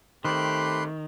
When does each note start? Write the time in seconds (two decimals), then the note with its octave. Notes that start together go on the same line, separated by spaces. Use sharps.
0.25 D#3 A3 C4 G4 B5 C6 F#6